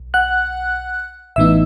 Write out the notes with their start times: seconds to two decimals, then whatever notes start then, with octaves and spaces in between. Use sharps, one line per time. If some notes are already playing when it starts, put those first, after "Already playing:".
Already playing: B1
0.14 F#5 F#6
1.36 A1 A2 E3 B3 D#4 E5 E6